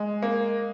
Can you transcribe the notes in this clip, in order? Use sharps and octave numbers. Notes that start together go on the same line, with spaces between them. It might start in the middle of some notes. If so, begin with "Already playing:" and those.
Already playing: G#3
A#3